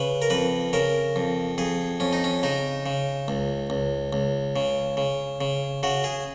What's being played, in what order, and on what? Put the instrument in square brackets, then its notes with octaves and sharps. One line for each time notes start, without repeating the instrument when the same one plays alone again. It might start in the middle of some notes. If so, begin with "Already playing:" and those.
Already playing: [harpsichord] C#3 B4
A#4
F2 B4
C#3 A#4
F2
F2 G#4
F2 C#4
D#4
C#4
C#3 D#4
C#3
C#2
C#2
C#2
C#3
C#3
C#3
C#3 F#4
G#4